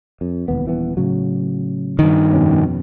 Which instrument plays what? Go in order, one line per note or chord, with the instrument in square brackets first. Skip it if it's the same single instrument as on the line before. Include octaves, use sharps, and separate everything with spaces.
[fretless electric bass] F2
E1 D#2 B3
D#1 E3 B3
A2 C#3 F#3
[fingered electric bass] G2 D#3
[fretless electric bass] F2 B2 C#4